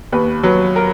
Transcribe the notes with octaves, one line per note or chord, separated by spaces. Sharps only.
D#2 B4
F#3 B4
A#4